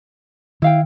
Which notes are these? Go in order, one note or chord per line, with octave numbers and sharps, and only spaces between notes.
D#3 E4 F5 G5